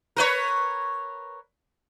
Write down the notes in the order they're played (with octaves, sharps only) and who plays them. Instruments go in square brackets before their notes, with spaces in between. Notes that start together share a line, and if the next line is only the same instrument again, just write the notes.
[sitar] A#4 B4 C#5